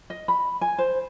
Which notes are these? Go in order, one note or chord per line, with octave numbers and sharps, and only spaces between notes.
D#5
B5
G#5
C5